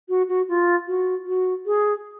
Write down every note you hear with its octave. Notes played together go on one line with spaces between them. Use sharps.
F#4
F#4
F4
F#4
F#4
G#4